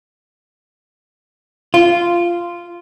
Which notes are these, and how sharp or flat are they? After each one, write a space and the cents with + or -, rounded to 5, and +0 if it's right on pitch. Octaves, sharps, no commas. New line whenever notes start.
F4 -10